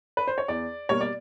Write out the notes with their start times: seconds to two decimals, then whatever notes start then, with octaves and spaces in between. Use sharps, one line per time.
0.17 B4
0.27 C5
0.38 C#5
0.48 E2 D5
0.89 B2 G3 A#3 C#5
1.01 D5